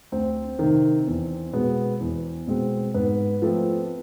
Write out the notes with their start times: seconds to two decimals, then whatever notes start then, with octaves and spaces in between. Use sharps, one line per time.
0.12 D2 C4 C5
0.59 C3 D#3
1.07 E2
1.53 B2 G#3 B3
2.00 E2
2.48 B2 G#3 C4
2.94 G#2 B3 B4
3.42 F3 A3 C4